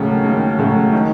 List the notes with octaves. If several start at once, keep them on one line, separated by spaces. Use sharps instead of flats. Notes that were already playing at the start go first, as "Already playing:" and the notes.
Already playing: D#2 C#3 F#3 A3
D#2
C#3 F#3 A3
D#3